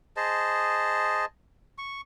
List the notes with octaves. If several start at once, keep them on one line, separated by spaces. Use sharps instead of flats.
G#4 C5 D#5 A5
C#6